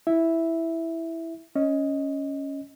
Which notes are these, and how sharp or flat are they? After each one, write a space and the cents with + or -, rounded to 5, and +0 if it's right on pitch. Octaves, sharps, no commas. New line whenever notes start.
E4 +0 E5 +0
C#4 +0 D#5 +5